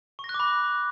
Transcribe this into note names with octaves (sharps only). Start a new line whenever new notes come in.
C#6
A#6
F#6
D6
B5